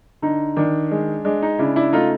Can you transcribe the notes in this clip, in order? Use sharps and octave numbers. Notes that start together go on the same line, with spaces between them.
D3 D#4
D#3 D4
G#3
G#3 D4
D#4
C#3 D4 E4
D4 E4
A3 D#4 F4